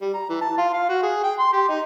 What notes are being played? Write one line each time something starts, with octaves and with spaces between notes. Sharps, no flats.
G3
A#5
E3
A5
F4
F5
F#4
G#4
G5
C6
G4
D#4